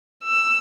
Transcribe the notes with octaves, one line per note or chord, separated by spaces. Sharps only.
E6